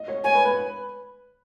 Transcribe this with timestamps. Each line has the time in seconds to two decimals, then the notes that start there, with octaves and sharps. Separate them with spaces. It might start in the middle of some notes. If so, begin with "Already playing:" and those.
Already playing: D#5
0.08 C#5
0.24 C#5 G#5
0.35 B4
0.45 B4